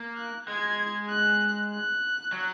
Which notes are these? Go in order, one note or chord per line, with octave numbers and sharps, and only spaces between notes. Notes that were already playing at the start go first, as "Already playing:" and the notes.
Already playing: A#3
F#6
G#3 G#6
F#6
F#6
F#3